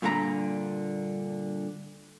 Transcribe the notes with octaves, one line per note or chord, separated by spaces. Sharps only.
G2 A#2 D3 F#4 A#5 B5